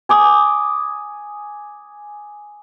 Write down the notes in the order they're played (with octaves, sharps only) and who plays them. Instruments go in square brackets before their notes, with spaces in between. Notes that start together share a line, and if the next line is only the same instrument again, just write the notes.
[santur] G#5 D6 D#6